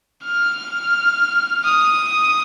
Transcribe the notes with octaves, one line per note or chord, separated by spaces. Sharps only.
F6
D#6